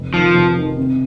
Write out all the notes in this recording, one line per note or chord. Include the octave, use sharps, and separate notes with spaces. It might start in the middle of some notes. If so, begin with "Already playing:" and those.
Already playing: F1
D#3 F3
F1
D#3
C3